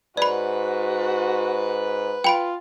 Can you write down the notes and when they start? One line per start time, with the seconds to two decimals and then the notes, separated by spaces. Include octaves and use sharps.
0.17 G#2 F#4 B4 D5 B5
2.24 F4 G5 B5 D7